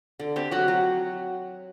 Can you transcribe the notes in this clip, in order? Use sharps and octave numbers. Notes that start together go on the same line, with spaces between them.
D3
C4 G4
F#3 F#4
F#3